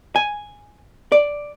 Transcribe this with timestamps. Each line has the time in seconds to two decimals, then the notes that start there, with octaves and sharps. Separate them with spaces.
0.16 G#5
1.12 D5